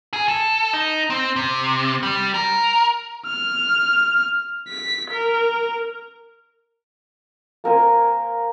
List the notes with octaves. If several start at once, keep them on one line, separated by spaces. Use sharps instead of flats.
G#4
A4
D#4
C4
C3
G3
A#4
F6
B6
A#4
A#3 A#4 C5 G#5